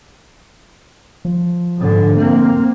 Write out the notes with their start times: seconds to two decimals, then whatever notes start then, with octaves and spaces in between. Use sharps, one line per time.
1.25 F3
1.77 G#2 D3
2.17 A#3 C4